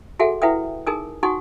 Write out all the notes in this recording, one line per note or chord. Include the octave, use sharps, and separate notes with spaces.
F#4 G#4 A4 E5 F#5 G#5
E4 B4 E5 F#5 G5 D#6
D#4 G#4 A#4 G#5 D#6
D#4 F#4 F#5 G#5 C#6 D#6